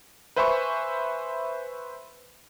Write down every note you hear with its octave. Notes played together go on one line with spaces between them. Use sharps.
B4 C5 E5 G#5 B5 C#6